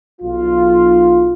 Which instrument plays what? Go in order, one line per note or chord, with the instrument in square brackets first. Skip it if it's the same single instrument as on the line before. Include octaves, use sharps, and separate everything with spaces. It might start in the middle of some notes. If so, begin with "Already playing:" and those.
[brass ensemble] B1 F4